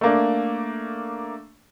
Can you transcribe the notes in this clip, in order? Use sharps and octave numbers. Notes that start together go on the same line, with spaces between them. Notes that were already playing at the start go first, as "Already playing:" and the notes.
A3 A#3 D4